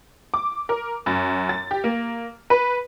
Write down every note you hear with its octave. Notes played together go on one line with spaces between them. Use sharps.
D6
A#4
F#2
A6
G4
A#3
B4